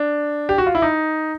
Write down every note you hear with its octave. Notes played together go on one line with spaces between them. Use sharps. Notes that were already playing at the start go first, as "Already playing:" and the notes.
Already playing: D4
G4
F#4
F4
E4
D#4